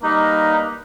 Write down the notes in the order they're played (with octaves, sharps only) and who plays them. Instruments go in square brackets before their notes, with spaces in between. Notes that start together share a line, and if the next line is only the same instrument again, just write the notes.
[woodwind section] G3 A#3 B4 [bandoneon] D#4